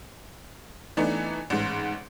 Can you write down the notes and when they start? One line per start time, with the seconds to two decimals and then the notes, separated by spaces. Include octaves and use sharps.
0.97 E3 A3 B3 D4 D#4
1.50 A1 G#2